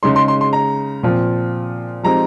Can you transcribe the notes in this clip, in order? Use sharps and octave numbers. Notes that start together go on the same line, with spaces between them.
C#3 G#3 D#4 C6
C6
C6
C6
A#5
A#2 F3 C4
F3 G#3 C4 D#4 G4 A#5